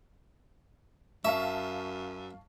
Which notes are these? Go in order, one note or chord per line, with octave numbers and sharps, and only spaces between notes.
F#2 E5 F5 A5 C#6